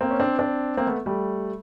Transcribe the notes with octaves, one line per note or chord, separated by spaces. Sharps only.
A#3 C4
C#4
C4 D4
C4 D4
A#3 C4
A3 B3
G3 A3